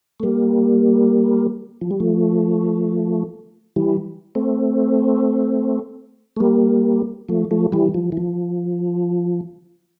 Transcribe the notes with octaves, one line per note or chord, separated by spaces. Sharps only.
A3
G3 A#3
F3
G3
F3 A3
E3 G3
A3 C4
A3
G3 A#3
F3 A3
F3 A3
E3 G3
F3
E3
F3